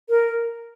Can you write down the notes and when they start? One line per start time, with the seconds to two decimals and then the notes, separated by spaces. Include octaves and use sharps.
0.09 A#4